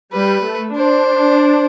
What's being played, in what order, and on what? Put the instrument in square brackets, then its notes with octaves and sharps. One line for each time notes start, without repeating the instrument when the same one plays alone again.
[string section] G3 [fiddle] B4
[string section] A3
[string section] D4 [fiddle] C5